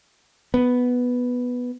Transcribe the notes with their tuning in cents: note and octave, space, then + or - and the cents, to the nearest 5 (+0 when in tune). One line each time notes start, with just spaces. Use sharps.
B3 +0